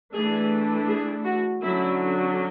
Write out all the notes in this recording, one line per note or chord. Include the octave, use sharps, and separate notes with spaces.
E3 A3 D4 G#4
G#4
F#4
D3 F#3 C#4 E4